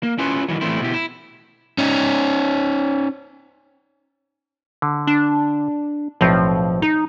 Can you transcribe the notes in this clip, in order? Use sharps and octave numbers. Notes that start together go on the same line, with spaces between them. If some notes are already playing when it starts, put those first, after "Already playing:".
A#3
C#4 E4 F4 G4 B4 C#5
D#3 E3 F#3
A2 E3 G3 A3 C4 E4
B2 E4 G4
E4
C#4 D#4
D3
D4
B1 A2 F3 C4
D#4